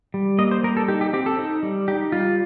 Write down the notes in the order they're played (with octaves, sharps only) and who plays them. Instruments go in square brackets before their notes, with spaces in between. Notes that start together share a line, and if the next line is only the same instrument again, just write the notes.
[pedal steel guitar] G3
A#3 D#5
C5
G3 A#4
A4
D#4 G4
G4
C4 G4
A4
D#4
G3
D#4 G4
G3 F4